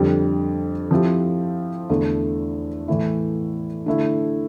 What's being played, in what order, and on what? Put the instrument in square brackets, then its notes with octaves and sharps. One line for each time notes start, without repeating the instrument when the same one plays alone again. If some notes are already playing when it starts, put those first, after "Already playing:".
Already playing: [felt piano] F2 D3 G3
F3 C4 E4 G4
E2 D3 A3 E4
A2 E3 A3 E4
D3 A3 E4